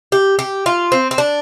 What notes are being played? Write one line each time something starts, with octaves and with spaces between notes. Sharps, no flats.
G4
G4
F4
C4
C4
D4